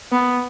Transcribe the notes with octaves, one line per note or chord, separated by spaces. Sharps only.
B3